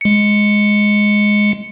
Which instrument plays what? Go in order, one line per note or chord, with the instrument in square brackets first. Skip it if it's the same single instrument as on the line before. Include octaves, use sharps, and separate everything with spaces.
[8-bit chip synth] G#3 C#7